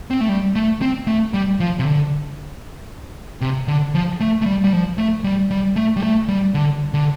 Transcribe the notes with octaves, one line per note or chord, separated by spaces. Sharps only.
C4
A3
G3
A3
C4
A3
G3
F3
C3
D3
C3
D3
F3
A3
A3
G3
G3
F3
A3
G3
G3
A3
G3
A3
G3
D3
D3